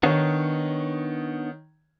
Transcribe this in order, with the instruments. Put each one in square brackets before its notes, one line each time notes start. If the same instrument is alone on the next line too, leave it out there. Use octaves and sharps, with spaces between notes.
[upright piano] D#3 C#5 [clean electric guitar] B3 D4 D#4